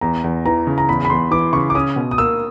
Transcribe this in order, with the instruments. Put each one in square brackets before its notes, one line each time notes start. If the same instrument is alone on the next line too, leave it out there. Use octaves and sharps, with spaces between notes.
[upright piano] E2 [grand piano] A#5
[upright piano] E2
[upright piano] E3 [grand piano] A#5
[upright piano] C#3
[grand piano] A#5
[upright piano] E2 [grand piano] B5
[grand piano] B5
[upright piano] E2 [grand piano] C6
[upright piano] E3 [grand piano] D6
[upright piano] C#3 [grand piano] C#6
[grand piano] D6
[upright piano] C#4 [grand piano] D#6
[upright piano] B2
[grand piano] D#6
[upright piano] A#3 [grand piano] E6